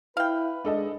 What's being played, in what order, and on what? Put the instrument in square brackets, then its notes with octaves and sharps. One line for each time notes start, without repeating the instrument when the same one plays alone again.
[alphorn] E4 [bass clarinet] B4 [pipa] F5 G5
[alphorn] G#3 [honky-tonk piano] D4 A4 D#5